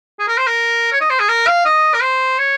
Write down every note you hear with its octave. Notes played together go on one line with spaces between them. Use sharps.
G#4
A#4
C5
A#4
C#5
D#5
C5
G#4
A#4
F5
D#5
A#4
C5
C#5